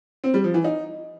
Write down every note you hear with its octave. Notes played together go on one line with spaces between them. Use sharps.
C4
G3
F3
E3
D#4